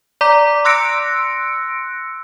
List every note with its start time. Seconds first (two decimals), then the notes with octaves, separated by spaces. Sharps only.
0.21 D5 A#5 D6 B6
0.65 C6 E6 F#6 A#6 C#7 D7